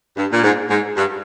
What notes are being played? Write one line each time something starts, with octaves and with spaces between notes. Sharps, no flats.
G2
A#2
G#2
G#2
G2